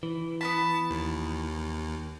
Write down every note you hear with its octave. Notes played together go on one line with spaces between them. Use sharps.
E3
B3 C#4 A5 B5
D#2